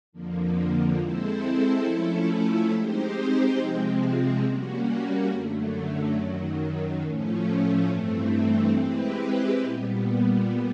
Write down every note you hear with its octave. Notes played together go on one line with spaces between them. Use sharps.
F2 D3 F3 A#3
G#3 C4 E4 A4 C5
F3 A3 C#4 E4 A4
G#3 C4 D#4 G4 C5
C3 F3 G#3 C4
G3 A#3 C#4 F#4
F#2 D3 F#3 A3
F#2 D#3 F#3
A2 F3 A3 C#4
G2 E3 A3 C4
G#3 C4 E4 G4 B4
A#2 G3 B3